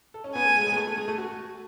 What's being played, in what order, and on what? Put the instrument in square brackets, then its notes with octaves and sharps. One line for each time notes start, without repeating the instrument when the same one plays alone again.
[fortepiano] A4
C#4
[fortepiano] B3 [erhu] G#5
[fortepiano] A3
G#3
G#3
B3
A3
A3
G#3
A3
F#4